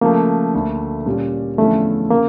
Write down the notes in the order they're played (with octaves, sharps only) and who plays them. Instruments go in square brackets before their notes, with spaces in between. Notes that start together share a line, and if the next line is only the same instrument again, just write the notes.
[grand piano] C#3 F3 A3 [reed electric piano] A#3
[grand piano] D2 D3 A3
A#2 G3 C#4
[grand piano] E2 D3 F3 C#4 E4 [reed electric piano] A3
[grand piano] C#3 [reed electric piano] A#3